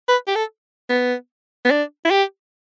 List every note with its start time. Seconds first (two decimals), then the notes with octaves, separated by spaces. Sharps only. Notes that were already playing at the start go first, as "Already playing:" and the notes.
0.09 B4
0.28 G4
0.36 A4
0.90 B3
1.65 B3
1.71 D4
2.05 E4
2.11 G4